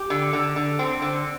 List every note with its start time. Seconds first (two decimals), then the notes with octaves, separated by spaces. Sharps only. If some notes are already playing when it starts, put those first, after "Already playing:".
Already playing: G4
0.10 D3
0.33 D3
0.56 D3
0.79 C4
1.02 D3